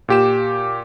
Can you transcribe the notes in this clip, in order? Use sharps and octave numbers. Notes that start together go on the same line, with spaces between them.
A#2 G4 E7